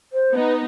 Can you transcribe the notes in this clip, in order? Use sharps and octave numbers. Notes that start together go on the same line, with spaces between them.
C5
B3 D#4 B4